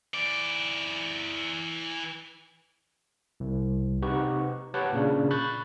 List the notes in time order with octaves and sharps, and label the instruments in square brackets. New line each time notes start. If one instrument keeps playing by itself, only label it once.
[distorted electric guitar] E3 D5
[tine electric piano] C2
C3 D#4 G4 B4 F#5 C#6
G4 B4 C#5 F#5 G5 A5
A#2 C#3 D4
B5 C#6 F#6 G6 A6